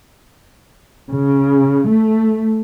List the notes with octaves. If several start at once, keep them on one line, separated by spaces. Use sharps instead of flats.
C#3
A3